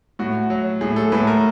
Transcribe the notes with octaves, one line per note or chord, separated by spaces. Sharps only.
A2 F#4
F#3
A2 G#4
A4
A2 B4
A#4